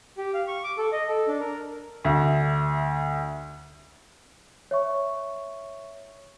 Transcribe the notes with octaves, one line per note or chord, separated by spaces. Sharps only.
G4
F5
C#6
D6
A4
D#5
A4
D4
A#4
D2 E5
C#5 E5 C#6